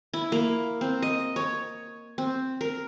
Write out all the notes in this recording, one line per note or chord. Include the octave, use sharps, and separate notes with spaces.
E4
A#3
C4
D#5
C#5
C4
A#4